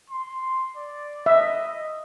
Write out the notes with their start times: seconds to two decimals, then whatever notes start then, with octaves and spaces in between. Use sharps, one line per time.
0.10 C6
0.77 D5
1.26 D#5 E5